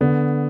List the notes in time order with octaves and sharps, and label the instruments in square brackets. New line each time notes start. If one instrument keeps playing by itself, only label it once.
[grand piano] D3 [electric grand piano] B3